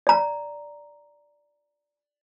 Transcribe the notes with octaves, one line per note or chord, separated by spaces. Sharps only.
D5 A#5